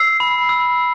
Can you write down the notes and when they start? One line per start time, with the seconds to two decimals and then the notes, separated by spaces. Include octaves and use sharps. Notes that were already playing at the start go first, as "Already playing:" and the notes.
Already playing: E6 C7
0.20 B5
0.49 E6